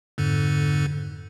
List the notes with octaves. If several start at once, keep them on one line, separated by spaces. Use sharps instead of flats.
F2 G#2 D3